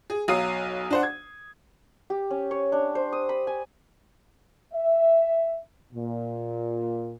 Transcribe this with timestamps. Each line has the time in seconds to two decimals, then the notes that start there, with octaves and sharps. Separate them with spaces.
0.10 G#4
0.28 B1 F#3 F5 D#6 C7 D#7
0.90 D4 C5 F#5
1.03 G#6
2.10 G4
2.30 C#4
2.51 C#5
2.72 D4
2.95 C5
3.12 D#6
3.29 B5
3.47 G#5
4.73 E5
5.94 A#2